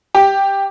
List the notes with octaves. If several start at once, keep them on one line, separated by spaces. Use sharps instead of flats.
G4